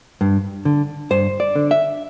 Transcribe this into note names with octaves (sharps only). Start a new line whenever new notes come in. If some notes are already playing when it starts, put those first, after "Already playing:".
G2
D3
G2 C5
D5
D3
E5